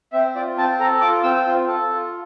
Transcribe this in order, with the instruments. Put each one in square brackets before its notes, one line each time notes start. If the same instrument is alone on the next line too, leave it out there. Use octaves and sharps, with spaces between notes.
[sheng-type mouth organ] C4 E5
F4 D5
C4 A5
A4 A#5
F4 D6
C4 E6
F4
A4
F4